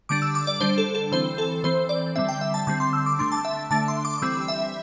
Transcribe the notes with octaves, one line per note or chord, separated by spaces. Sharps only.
D3 G3 D4 D6
E6
D6
D5
D3 G3 D4 C5
A4
A4
E3 C4 C5
A4
E3 C4 C5
D5
D3 G3 C4 E5
G5
E5
A5
D3 G3 C4 A5
C6
E6
D6
D3 A3 D4 C6
A5
E5
D3 A3 D4 A5
C6
D6
D6
E3 G3 C4 E6
E5